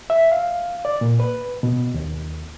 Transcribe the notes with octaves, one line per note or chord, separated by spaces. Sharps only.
E5
F5
D5
A#2
B4
B2
D#2